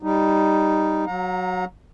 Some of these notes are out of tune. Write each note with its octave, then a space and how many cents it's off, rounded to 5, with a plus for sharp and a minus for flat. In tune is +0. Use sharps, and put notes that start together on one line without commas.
G3 +0 D#4 +0
F#3 -5 F5 +45 A#5 +0